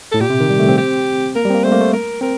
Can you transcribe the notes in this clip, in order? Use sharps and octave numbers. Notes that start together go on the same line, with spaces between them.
A2 A4
A#2 G4
C3
D#3
G3
A3
C4
G4
A#3 A#4
G3
C4
A#3
A3 C5
A#3
A3
A#4
C4 A#4